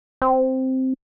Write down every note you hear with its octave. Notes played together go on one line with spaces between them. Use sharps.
C4